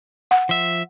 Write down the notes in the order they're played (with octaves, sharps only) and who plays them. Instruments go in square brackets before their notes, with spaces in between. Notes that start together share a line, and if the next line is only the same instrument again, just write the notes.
[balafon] F#5
[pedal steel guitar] F3 E5